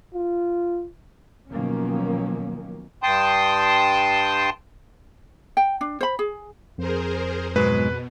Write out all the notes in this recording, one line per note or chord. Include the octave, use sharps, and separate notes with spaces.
F4
B2 D#3 F3 F#3 A#3 C#4
G2 G5 A5 C6 D#6 G6
G5
D4
C5 B5
G#4
F2 G#4 A#4 C5
G#2 B2 F#3 G#3 B4